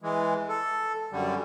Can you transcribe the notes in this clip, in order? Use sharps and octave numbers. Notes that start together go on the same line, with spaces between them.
E3 G#3
A4
F#2 D3 G3